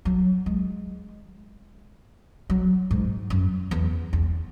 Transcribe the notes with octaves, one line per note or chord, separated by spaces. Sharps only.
F#3
G#3
F#3
G#2
F#2
E2
E2